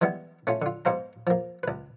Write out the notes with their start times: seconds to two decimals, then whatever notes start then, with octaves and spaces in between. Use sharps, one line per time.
0.01 E3 G3 G#3 B3
0.47 A3 C#4 F4
0.62 D3 F4
0.85 G#2 B2 C5 F5 A#5
1.27 F3 A#3
1.63 C#2 B4